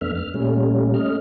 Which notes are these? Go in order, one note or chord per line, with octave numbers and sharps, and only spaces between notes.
F2 A3 B3 D4 E5 F6
F6
A#2 G3 A3 C#4
A3 C#4 D#5 F6